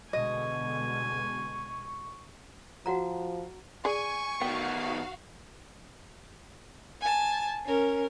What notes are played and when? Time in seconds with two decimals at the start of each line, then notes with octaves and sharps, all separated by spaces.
0.13 B2 D3 G#3 D#5 G#5 C#6
2.86 F3 F#4 F#5 A#5
3.85 G#4 D5 G#5 C#6
4.41 D#3 B3 F#4 F5 G5
7.01 G#5 A5
7.65 C#4 A#4